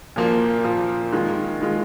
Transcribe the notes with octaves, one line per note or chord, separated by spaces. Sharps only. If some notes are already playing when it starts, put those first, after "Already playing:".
A#2 F3 A#3 F4
A#2 F3 A#3 F4
D#3 G#3 F4
D#3 G#3 F4